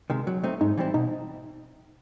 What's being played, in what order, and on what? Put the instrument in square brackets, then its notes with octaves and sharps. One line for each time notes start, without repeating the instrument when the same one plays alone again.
[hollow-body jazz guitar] C3 D#3 G#3
F#3
A3 C4 D#4
[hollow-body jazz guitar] G#2 [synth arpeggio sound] D#4
[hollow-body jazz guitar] E3 G3 C4 E4
[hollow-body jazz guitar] B2 [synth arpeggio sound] D#4